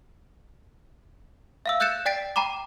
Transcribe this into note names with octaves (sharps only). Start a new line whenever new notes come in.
E5 F5 E6
E6 F#6 G6 A6 C#7 E7
D5 G5 A6 B6 D7
G5 A#5 B5 D6